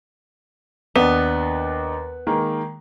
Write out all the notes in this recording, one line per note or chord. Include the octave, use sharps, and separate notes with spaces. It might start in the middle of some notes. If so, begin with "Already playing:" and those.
D#2 B3 D4
D#3 G#3 A#3